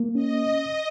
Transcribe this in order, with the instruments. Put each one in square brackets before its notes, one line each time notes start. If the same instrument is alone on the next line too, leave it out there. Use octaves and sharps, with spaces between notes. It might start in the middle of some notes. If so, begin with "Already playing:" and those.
Already playing: [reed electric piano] A#3
[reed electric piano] C#4 [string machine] D#5